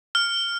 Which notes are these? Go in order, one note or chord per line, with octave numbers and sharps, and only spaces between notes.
F6